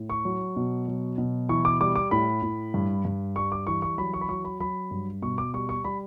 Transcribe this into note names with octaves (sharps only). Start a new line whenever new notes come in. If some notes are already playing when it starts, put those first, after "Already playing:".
Already playing: A2
C#6
F#3
B2
F#3
B2
E3 C#6
D6
G3 D6
D6
A2 B5
A2
G2
G2
G3 C#6
D6
E3 C#6
C#6
F#3 B5
C#6
B5
F#3 C#6
B5
F#3 B5
G2
B2 C#6
D6
G3 C#6
C#6
G3 B5